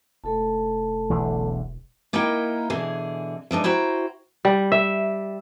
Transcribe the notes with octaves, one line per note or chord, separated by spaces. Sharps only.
E1 A3 A4 A5
B1 E2 D3
A#3 D#4 E4 A#4 D#5 G5
B2 D3 E3 G#4
E3 G#3 D4 D#4
E4 F#4 C5 G5 A#5
G3
E5